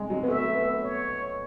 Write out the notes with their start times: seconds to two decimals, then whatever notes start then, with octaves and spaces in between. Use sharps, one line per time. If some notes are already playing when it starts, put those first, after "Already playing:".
Already playing: G#3
0.10 F#3
0.23 B3
0.28 A3 E5
0.55 B3
0.83 C#5